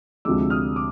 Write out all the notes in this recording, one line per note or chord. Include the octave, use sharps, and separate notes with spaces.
D2 C3 F3 G#3 D6 E6
D#6 F6
D6